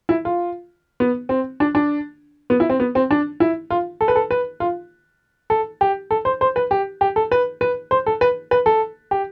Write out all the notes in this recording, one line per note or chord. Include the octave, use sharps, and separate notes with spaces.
E4
F4
B3
C4
D4
D4
B3
E4
C4
B3
C4
D4
E4
F4
A4
B4
A4
B4
F4
A4
G4
A4
C5
C5
B4
G4
G4
A4
B4
B4
C5
A4
B4
B4
A4
G4